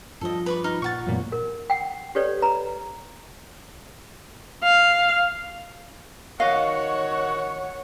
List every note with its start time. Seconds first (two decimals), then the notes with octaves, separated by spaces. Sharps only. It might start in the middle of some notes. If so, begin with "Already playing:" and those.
0.21 G2 F3 F4 A4 D#5
0.46 B4 D5 C#6
0.64 D#4 F6
0.82 A#2 F5 F#5 C#6 A6
1.06 F#2 A#2 E3 A3 B3
1.32 A#4
1.70 F#5 G5
2.15 G4 A4 B4 C#5 D5
2.42 B4 A#5
4.64 F5
6.40 D#3 F#4 C#5 D#5 F5 F#5